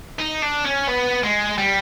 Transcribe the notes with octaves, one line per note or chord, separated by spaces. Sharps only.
D#4
D4
C#4
B3
G#3
G3